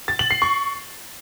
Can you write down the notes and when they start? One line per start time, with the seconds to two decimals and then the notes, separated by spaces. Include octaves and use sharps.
0.08 A6
0.19 F#7
0.31 C7
0.42 C#6